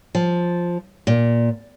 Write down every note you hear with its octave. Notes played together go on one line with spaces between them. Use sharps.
F3
A#2